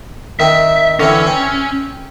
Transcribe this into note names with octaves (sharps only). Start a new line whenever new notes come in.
D#3 C4 E5
D3 E3 C4 C#4
C4